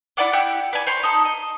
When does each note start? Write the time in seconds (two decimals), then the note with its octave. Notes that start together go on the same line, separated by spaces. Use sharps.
0.17 E4 D5 F#5 D6
0.33 E4 G4 F#5
0.73 B4 D5 G#5
0.87 C5 C#5 B5
1.03 D#4 A4
1.25 D#5